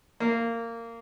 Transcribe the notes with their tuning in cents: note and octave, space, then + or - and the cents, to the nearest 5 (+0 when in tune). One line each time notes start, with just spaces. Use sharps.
A#3 -15